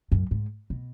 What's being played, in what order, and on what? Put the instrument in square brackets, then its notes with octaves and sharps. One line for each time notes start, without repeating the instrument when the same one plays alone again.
[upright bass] F#2
G#2
B2